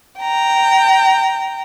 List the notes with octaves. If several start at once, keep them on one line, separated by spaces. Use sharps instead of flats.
G5 A#5